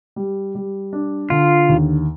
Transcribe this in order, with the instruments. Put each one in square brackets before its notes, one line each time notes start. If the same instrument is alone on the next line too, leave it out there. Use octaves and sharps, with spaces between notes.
[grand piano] G3
G3
D4
[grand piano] D3 [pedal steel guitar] F4
[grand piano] D#2